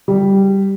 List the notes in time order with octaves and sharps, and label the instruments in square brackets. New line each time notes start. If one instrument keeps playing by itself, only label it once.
[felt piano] G3